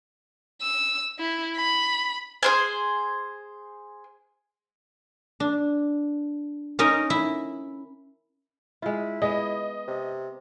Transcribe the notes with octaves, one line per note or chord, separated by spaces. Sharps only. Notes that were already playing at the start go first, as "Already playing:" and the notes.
E6
E4
B5
G#4 C5 G#5
D4
C#4 D#4 A#4 D#5
E4
G#3 E4 F4
G#3 B3 D#5
C3